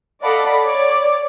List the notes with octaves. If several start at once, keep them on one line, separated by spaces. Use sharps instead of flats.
A4 D5 D#5 F5 F#5 B5
C#5 D5 D6